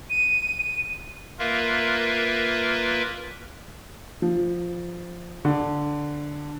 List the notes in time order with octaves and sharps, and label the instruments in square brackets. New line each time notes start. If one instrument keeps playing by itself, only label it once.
[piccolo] D#7
[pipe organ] A#3 F4 A#4 B4 E5
[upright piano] F3
D3